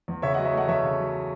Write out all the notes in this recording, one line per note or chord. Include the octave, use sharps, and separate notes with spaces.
E2
C#3 C#5 E5
D#5 F#5
F#3
C#5 E5
A3 D#5 F#5
E2 C#5 E5
C#3
F#3